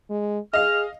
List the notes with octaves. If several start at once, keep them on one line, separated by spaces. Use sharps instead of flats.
G#3
G#4 D#5 F5 F6